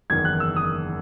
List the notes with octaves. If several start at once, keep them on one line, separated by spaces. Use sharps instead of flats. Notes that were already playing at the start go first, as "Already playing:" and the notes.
F#1 E2 D#3 G#6
F#6
E6
D#6